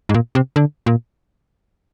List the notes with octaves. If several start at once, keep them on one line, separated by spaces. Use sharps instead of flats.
G#2
A#2
C3
D3
A#2